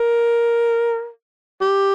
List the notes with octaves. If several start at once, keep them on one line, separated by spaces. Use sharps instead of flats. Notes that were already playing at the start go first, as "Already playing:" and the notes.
Already playing: A#4
G4